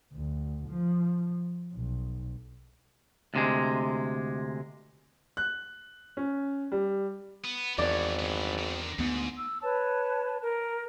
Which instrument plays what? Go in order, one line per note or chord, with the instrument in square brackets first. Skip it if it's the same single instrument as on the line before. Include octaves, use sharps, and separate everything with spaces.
[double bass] D2
F3
B1
[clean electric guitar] D2 C3 G#3
[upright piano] F#6
C#4
G3
[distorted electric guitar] B3
[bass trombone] G#1 [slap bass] E2 [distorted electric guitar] E3 C#5 [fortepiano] D5
[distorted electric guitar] G2 B3
D3 D#3
[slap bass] D2 B3 [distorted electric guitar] G#2
[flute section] E6
B4 C#5 A5
A#4